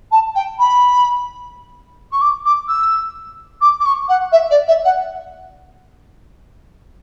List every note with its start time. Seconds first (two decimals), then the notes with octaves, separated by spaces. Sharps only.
0.11 A5
0.35 G5
0.58 B5
2.11 C#6
2.21 D6
2.45 D6
2.68 E6
3.61 D6
3.80 D6
3.85 C#6
4.08 F#5
4.32 E5
4.50 D5
4.67 E5
4.84 F#5